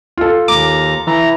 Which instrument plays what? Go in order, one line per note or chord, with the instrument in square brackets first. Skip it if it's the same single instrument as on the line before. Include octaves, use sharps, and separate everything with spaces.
[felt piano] F4 A4
[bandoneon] D#2 A#5 [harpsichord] D6
[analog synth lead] E3 [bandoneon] A#5